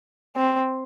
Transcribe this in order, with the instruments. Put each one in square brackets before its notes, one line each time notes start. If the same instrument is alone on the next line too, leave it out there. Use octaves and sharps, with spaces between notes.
[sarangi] C4